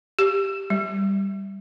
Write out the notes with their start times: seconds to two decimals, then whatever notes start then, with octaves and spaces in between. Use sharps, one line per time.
0.19 G4
0.70 G3